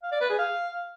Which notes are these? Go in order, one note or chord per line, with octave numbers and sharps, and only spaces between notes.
F5
D5
B4
G#4
F5